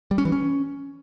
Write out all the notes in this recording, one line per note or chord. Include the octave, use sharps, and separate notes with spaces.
G3
C#4
E3
C#4